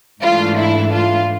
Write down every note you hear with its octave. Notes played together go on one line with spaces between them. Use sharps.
G#2 E3 A3 D4 F4
E4
F4